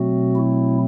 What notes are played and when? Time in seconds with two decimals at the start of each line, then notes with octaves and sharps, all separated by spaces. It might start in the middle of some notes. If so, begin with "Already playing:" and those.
Already playing: B2 F#3 A3 C4 F#4
0.36 E4